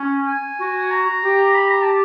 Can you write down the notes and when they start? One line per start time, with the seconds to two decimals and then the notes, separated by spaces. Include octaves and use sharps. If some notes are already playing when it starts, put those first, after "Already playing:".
Already playing: C#4
0.27 G#5
0.59 F#4
0.91 A#5
1.23 G4
1.55 B5
1.68 A#5
1.82 A5